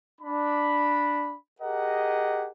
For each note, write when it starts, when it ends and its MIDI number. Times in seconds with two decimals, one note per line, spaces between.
0.21 1.34 62
0.21 1.34 83
1.61 2.48 67
1.61 2.48 68
1.61 2.48 70
1.61 2.48 75
1.61 2.48 78